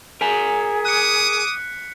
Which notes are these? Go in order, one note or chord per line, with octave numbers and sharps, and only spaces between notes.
G#4 A#4 G#5 A#5 B6
D6 D#6 F#6 C#7